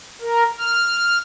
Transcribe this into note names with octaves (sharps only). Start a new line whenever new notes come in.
A#4
F6